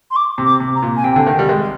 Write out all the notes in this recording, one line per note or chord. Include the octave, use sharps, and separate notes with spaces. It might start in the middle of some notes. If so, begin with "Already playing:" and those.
C6
D6
C3
D6
C3
A#5
A#2
G#5
C3 G5
D3
D#3
G3
G#3